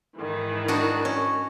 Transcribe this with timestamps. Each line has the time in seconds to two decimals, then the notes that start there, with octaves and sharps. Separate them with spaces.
0.18 G#2 D#3 E3
0.68 D4 D#4 F#4
1.05 C#4